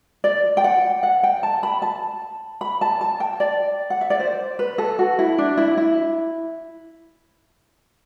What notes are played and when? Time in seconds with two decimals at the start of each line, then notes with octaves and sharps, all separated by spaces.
0.24 D5
0.57 G5
0.64 F#5
1.03 F#5
1.23 G5
1.43 A5
1.63 B5
1.82 A5
2.61 B5
2.81 A5
3.01 A5
3.20 G5
3.40 D5
3.90 F#5
4.01 E5
4.10 D5
4.19 C5
4.59 B4
4.78 A4
4.99 F#4
5.19 E4
5.38 D4
5.58 E4
5.77 E4